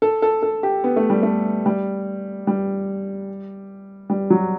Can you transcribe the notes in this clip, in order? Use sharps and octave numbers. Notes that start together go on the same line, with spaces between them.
A4
A4
A4
G4
B3
A3
G3
A3
G3
G3
G3
F#3